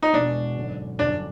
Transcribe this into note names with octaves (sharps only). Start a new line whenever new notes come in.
D#4
E1 E2 B2 G#3 D4
G#1 F#2 D3
G1 F#2 D3 D4